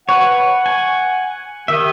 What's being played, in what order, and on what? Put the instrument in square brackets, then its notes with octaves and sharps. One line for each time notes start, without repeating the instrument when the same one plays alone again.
[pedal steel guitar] B4 C#5 [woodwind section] F#5
[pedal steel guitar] G#5
[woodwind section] D#3 G4 [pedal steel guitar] D#5 E5